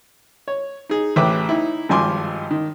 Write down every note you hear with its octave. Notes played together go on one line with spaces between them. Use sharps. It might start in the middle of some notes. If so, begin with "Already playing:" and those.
C#5
D#4 G#4
A1 E3 B4 E5 G5 D6
D#4 E4
G#1 G2 F3 G#5 C6 D6
D#3